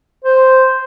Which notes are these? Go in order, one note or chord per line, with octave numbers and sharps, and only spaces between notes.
C5